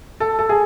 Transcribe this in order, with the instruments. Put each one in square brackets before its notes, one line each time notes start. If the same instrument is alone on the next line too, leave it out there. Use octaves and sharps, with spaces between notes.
[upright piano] A4
A4
G#4